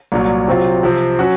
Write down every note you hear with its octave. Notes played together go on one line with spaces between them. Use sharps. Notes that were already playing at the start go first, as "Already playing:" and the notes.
C2 A#2 F#3
C3 F#3 C4 F4
C3 F3 C4
F#3 C#4 F#4